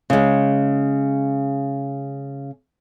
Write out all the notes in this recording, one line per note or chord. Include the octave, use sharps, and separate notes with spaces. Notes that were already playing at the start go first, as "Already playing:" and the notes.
C#3 G#3